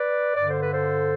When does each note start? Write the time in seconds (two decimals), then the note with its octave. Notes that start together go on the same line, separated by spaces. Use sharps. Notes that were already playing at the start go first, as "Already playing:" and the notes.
Already playing: B4 D5
0.36 G2 D3 D5
0.48 C5
0.60 B4
0.71 A4 C5